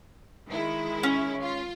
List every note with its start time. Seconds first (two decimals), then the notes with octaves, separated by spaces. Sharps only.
0.49 D#3 G#3 E4
1.03 C#4
1.41 F4